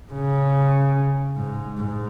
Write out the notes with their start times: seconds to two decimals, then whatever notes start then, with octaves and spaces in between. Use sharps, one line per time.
0.13 C#3
1.36 G#2
1.78 G#2